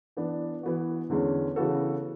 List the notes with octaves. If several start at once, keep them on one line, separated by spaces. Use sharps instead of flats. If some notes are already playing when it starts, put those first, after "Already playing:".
E3 B3 D4
E3 B3 F#4
E2 D3 G#3 C#4
C#3 E3 B3 F#4 A4